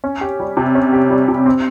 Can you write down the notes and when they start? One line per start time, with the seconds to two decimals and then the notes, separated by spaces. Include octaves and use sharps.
0.04 C#4
0.21 G4
0.40 G3
0.57 C3
0.75 C#4
0.93 G4
1.10 G3
1.28 C3
1.46 C4